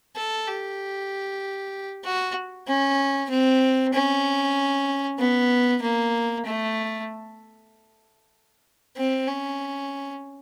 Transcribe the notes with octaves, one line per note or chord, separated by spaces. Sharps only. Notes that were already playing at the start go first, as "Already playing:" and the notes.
A4
G4
F#4
C#4
C4
C#4
B3
A#3
A3
C4
C#4